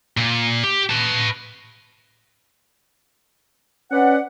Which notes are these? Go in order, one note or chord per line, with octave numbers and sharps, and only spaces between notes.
A#2
G4
B4 A5
C#4 B4 D5 F#5